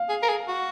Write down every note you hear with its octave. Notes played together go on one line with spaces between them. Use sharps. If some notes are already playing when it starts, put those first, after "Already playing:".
Already playing: F5
G#4
A#4
G#4
F#4